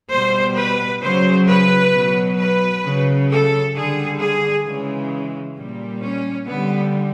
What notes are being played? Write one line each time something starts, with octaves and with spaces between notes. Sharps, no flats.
B2 G3 C5
B4
C#3 F#3 C5
B4
B2 F#3
B4
C#3 F#3
A4
D3 G3 G#4
G#4
C#3 E3 G#3
A#2 G3
C#4
D3 G3 B3